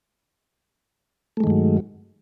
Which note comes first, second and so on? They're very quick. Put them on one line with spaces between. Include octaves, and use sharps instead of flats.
A3 G#3 D#3 G2 F#3